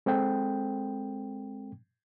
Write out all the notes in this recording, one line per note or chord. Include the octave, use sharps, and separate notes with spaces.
G#3 C4 A4 G5